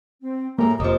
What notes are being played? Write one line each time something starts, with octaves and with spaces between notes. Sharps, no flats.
C4
F#2 A2 G3 G#3 A#3 A#5
F1 D#2 F3 C#4 D#6